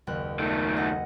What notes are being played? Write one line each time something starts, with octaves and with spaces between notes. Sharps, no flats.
F#1 D#2 F#6
D#3 A3
D#5 F#5